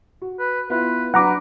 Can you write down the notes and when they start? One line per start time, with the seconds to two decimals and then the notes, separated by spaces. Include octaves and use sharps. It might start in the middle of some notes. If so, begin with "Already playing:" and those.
0.22 F#4
0.40 B4
0.70 B3 E4 F4 B4
1.14 F#3 D4 B4 F#5 A#5 D6